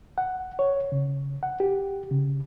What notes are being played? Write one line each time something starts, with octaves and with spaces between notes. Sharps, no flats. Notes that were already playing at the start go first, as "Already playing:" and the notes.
F#5
C#5
C#3
F#5
G4
C#3